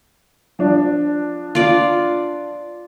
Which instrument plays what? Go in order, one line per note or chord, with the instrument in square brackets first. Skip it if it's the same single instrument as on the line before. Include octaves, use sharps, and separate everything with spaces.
[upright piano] F3 D4
[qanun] F4 D5